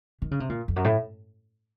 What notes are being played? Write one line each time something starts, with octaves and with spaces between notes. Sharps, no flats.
D#3
C#3
C3
A#2
F2
F#2
A2